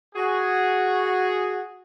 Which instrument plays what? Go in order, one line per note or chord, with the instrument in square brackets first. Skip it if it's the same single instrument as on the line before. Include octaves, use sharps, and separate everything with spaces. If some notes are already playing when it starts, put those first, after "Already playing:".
[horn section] F#4 G#4